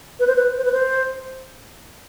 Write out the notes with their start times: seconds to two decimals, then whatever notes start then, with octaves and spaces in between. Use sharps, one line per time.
0.20 B4
0.27 C5
0.36 B4
0.57 C5
0.65 B4
0.73 C5